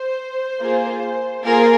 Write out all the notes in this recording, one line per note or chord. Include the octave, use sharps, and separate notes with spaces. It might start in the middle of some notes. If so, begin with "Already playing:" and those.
Already playing: C5
A#3 F4 G#4
A#3 F4 G#4 A#4